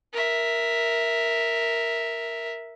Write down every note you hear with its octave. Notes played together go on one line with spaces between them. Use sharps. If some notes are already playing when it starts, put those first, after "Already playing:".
A#4 E5